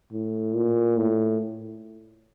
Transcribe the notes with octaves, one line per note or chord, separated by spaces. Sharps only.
A2
A#2
A2